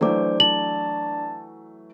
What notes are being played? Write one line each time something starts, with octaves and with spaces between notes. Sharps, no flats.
E3 F#3 A3 D4 C5 D5 D6
A5 F#7